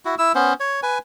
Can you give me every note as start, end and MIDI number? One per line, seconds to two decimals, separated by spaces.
0.05 0.15 64
0.05 0.15 66
0.18 0.32 64
0.18 0.32 88
0.35 0.53 59
0.35 0.53 61
0.35 0.53 72
0.60 0.80 73
0.83 0.98 71
0.83 0.98 80